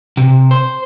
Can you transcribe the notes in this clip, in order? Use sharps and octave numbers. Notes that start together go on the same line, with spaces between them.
C3
C5